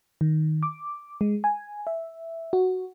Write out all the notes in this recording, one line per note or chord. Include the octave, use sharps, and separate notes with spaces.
D#3
D6
G#3
G#5
E5
F#4